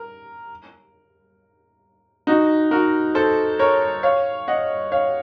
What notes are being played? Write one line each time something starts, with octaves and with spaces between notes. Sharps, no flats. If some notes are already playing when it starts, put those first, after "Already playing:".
Already playing: A#4
D#4 F#4
F#4 A#4
A4 C5
A#4 C#5
C#5 F5
D#5 F#5
C#5 F5